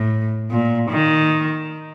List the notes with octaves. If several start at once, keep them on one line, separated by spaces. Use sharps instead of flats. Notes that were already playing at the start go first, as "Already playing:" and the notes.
Already playing: A2
A#2
D#3